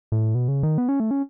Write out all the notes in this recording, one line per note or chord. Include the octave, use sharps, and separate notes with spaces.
A2
B2
C#3
D#3
B3
C#4
A3
C#4